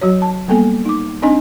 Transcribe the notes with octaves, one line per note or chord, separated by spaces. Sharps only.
F#3 F#4 C#5
A5
G3 A#3 B3 A4 G#5
D#4 D6
C4 D4 D#4 D#5 G#5